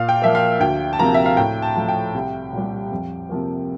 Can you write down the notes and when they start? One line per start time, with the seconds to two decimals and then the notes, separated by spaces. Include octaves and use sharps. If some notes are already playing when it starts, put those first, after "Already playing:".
Already playing: A#2 F5
0.09 G5
0.22 F3 A#3 E5
0.35 F5
0.60 D2 G5
0.93 A5
0.99 C3 F3 A#3 A#5
1.14 E5
1.26 F5
1.37 A2 G5
1.62 A5
1.75 F3 A3
1.88 G5
2.14 C2
2.53 A#2 G3
2.92 F2
3.29 C3 F3 A#3